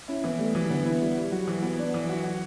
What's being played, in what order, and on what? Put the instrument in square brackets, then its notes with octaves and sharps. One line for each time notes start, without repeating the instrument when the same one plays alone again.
[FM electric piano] C#4 [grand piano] E4
[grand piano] E3 [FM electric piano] B3
[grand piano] G3 [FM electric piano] A3
[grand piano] E3 [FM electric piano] F#3
[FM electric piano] D3 [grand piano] B3
[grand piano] E4
G3
G3
[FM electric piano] F#3 [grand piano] F#4
[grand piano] E3
B3
D4
E3
F#4
F#4